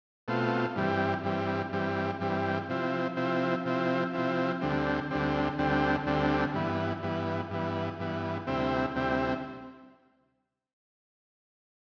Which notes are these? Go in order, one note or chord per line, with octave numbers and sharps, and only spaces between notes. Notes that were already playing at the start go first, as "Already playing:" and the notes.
B2 A3 C4 F4
G2 E3 G3 C4
G2 E3 G3 C4
G2 E3 G3 C4
G2 E3 G3 C4
C3 F3 C4 E4
C3 F3 C4 E4
C3 F3 C4 E4
C3 F3 C4 E4
D2 D3 G3 C4
D2 D3 G3 C4
D2 D3 G3 C4
D2 D3 G3 C4
G2 E3 B3
G2 E3 B3
G2 E3 B3
G2 E3 B3
D2 C3 G3 C4 E4
D2 C3 G3 C4 E4